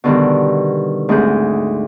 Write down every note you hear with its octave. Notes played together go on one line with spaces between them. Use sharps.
B2 D3 D#3 G3
D2 G#2 C4 D#4 G#4 G6